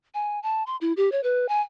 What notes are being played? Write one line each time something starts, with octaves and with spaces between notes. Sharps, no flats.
G#5
A5
C6
E4
G4
C#5
B4
G#5